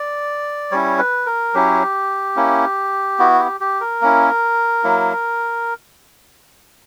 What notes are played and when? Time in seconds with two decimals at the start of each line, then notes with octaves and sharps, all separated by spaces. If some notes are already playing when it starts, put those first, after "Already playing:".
Already playing: D5
0.71 G3 C#4 E4 C#5
0.99 B4
1.26 A#4
1.54 F#3 C#4 E4 G4
2.36 A#3 C#4 E4
3.19 B3 E4 F#4
3.40 G4
3.61 G4
3.81 A#4
4.02 A#3 C#4 E4
4.84 F#3 A#3 E4